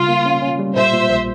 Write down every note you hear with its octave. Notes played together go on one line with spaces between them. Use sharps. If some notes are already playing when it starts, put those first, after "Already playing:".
Already playing: C#3 G3 F4
A#3
C#4
C#4
G3
A#2 C5 E5
A#2
A#1